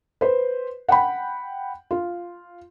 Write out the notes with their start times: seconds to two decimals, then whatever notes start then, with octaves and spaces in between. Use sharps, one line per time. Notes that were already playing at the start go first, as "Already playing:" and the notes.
0.21 B4 C5
0.89 F#5 G5 B5
1.91 F4